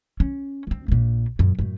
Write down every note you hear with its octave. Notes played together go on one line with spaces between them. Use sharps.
C#4
D2 C4
A#1 A#2
F#2 A#2
F#2 A2